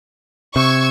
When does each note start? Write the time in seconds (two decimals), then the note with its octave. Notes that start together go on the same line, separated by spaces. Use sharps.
0.56 C3 C#6 E6 G#6